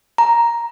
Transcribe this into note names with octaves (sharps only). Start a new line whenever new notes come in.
A#5